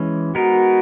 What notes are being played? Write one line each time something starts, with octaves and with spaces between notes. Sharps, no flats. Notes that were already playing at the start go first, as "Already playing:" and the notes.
Already playing: E3 G#3 C#4
G#3 B3 D#4 F#4 A#4